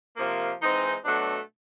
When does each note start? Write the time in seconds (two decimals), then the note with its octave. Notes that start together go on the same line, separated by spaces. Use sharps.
0.17 C3 F3 A#3
0.60 E3 G#3 C4 D#4
1.02 B2 F#3 A3 D4 F#4